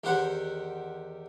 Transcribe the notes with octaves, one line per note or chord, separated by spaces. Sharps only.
E2 D#3 G4 C5 F#5 B5